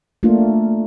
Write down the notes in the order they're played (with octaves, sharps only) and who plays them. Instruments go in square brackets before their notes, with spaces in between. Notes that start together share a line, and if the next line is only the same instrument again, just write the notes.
[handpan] A3 A#3 D4 F4